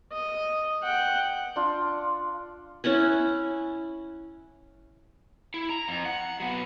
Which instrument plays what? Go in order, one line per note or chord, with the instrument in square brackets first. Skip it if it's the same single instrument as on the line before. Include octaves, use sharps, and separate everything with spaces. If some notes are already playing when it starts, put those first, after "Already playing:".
[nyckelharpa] D#5
F#5 G5
[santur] D4 F4
[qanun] C#4 E4 F#5 G#5
[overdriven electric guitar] E4
A#5
F2
F#5
F#3 B3